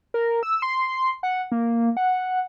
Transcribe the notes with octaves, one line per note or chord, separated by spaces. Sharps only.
A#4
E6
C6
F#5
A#3
F#5